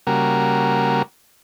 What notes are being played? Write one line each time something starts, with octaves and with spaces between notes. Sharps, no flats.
C#3 G3 A#3 F#4 A#4